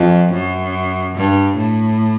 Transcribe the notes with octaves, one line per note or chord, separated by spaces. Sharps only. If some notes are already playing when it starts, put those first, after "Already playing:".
Already playing: F2
F#2
G2
A2